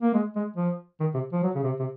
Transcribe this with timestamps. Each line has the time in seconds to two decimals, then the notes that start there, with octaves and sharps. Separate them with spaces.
0.02 A#3
0.14 G#3
0.35 G#3
0.56 F3
1.00 D#3
1.14 C3
1.32 F3
1.43 F#3
1.55 C#3
1.63 C3
1.79 C3